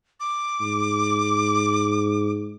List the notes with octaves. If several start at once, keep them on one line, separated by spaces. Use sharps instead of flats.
D6
G#2